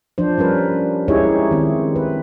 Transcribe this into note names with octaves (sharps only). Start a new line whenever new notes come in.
F3 D4 C5
G3 C#4 A#4 B4
G#3 D#4 E4 G4 G#4 C#5
D#3 C4
B4